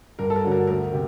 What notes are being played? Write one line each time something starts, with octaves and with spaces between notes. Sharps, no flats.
G2 A#4
A4
A#4
D3 F#3
A#4
D2 A#4
C3